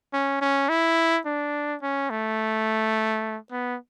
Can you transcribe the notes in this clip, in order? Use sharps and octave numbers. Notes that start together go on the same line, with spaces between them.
C#4
C#4
E4
D4
C#4
A3
B3